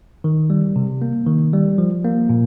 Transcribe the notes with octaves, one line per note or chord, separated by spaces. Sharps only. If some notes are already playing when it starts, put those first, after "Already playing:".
D#3
G3
C3
A#3
D#3
G3
F3
A#3
A#2